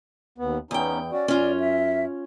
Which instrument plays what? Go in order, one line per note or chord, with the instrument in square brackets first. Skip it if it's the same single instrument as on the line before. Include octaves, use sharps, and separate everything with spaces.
[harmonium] D#2 B3
[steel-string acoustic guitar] E2 G5 [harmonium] B3 C#4 D#4
[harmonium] C#4 F#4 [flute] D5
[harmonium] F#2 [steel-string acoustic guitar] C#4 F4
[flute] E5